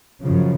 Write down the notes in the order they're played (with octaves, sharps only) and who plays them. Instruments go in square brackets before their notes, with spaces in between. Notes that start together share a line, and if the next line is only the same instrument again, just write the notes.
[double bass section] F#2 C#3 F3